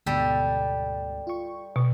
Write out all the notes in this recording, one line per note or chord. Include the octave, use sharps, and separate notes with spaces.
D2 G#2 B2 G3 G4 A4
F4 C#6
B2 C#6